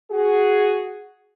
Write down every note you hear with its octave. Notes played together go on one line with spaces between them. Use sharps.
F#4 G#4